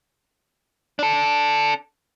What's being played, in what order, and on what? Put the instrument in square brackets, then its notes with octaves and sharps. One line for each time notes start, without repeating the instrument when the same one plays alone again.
[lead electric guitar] D4 A4